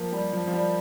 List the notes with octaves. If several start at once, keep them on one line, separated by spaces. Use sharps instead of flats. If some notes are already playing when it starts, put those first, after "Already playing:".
Already playing: F3 A#3
G3
F3
F3
G3